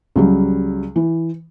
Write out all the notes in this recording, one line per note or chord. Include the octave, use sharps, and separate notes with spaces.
C#2 F#3 G3
E3